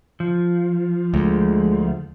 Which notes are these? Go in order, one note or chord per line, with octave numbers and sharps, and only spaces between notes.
F3
D2 G#3